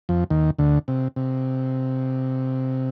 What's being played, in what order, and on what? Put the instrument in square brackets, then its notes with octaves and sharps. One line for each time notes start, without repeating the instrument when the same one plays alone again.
[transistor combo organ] F2 F3
D#2 D#3
D2 D3
C3
C3